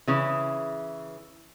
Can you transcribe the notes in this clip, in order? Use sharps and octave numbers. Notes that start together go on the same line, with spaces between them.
C#3 E3